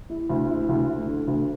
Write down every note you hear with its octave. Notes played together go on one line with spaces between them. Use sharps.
E4
D2
E4
D2
D3
D3
D2